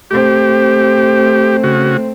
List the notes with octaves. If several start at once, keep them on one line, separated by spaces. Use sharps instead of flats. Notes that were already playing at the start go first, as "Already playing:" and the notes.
A3 C4 G4
C#3 F#4